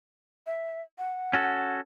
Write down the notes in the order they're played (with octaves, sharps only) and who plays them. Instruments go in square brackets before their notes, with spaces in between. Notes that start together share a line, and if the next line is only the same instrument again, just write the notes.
[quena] E5
F#5
[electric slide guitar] C#4 F#4 A4